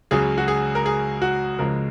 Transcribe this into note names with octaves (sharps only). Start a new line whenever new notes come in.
C#2 C#3 F#3 G#4
F#4
G#4
A#4
G#4
F#4
C#2 C#3 F3 G#3 A#4